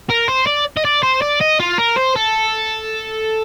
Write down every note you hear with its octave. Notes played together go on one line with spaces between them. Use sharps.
A#4
C5
D5
D#5
D5
C5
D5
D#5
F4
A#4
C5
A4